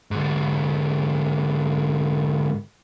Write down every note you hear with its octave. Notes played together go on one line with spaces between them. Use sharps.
G#2 D3